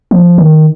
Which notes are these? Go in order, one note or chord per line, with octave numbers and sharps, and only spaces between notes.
F3
D#3